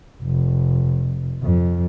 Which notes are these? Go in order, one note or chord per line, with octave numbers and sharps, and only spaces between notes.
F1
F2